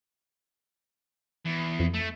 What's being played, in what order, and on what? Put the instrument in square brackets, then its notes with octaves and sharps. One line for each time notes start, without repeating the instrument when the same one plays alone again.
[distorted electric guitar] E2
[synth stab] F2
[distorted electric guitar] A3